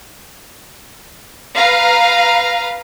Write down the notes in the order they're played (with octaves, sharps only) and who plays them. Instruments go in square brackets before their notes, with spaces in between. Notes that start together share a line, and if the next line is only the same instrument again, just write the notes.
[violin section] B4 F5 A#5